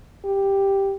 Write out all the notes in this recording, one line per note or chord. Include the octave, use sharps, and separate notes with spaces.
G4